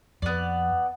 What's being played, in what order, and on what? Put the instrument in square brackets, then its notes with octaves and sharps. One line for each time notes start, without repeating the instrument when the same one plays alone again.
[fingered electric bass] F2 [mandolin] B3 D5